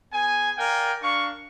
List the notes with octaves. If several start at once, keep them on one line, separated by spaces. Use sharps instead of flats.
B3 G#4 G#5
A#4 D5 F5 G5 G#5
D4 A#4 F5 C#6